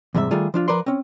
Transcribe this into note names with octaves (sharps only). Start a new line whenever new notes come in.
E2 G#2 C3 G3 E5
D#3 G3 A3 F4 G#4
F3 D4 F4
F3 A#4 B4 D5 C6
C4 C#4